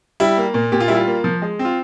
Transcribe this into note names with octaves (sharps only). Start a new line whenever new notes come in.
G3 E4
A#3
A#2
A#2 G4
F4
G3 E4
F4
A#3
F3
G#3
C4
F4